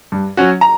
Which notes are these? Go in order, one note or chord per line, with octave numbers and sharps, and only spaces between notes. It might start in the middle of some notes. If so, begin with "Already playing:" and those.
G2
F#3 C#4 F#4
A#5